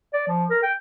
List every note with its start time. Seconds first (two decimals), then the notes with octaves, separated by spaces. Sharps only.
0.13 D5
0.28 F3
0.50 A#4
0.63 G5